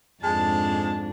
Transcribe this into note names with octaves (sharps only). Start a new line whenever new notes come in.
F2 G#2 G#3 D4 A5